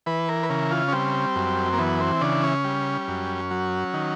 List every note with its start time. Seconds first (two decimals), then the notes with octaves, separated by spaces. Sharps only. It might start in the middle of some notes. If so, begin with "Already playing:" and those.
0.06 E3 B4
0.29 A#4
0.43 B4
0.50 C#3 A#4
0.71 F4
0.88 C#4
0.92 G3 C4
1.36 F#2
1.73 A#3
1.78 E3 B3
2.00 C4
2.21 C#3 D4
2.44 C#4
2.65 G3
3.08 F#2
3.51 F#3
3.94 D#3